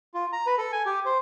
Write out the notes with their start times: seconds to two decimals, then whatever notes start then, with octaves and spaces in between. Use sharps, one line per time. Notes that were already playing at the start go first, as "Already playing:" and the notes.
0.14 F4
0.33 A#5
0.46 B4
0.58 A4
0.73 G#5
0.86 G4
1.06 C5